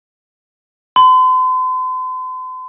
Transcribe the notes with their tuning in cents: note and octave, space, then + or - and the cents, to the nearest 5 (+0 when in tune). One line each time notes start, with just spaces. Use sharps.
C6 -45